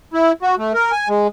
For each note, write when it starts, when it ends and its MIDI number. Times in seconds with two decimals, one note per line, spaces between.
0.14 0.32 64
0.42 0.55 66
0.58 0.73 57
0.74 0.92 70
0.92 1.08 80
1.09 1.27 56